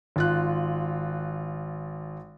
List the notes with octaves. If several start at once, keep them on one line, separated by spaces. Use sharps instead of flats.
G#1 F4 F#6